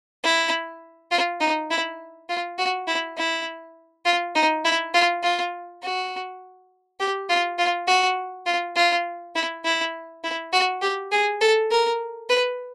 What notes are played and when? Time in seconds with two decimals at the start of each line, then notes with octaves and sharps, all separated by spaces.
0.24 E4
1.11 F4
1.40 D#4
1.70 E4
2.29 F4
2.58 F#4
2.88 E4
3.17 E4
4.05 F4
4.35 D#4
4.65 E4
4.94 F4
5.23 F4
5.83 F#4
7.00 G4
7.29 F4
7.58 F4
7.88 F#4
8.46 F4
8.76 F4
9.35 E4
9.65 E4
10.24 E4
10.53 F#4
10.82 G4
11.12 G#4
11.41 A4
11.71 A#4
12.29 B4